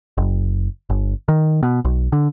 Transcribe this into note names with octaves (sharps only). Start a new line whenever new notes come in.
F#1
G1
D#3
B2
B1
D3